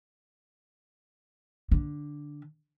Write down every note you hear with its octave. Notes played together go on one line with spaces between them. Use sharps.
D3